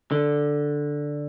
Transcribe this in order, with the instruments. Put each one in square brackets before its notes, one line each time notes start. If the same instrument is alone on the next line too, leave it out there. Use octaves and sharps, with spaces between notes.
[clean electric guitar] D3